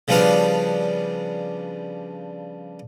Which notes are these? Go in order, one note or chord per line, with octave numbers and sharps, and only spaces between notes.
C#3 F3 G3 B3 D4 F5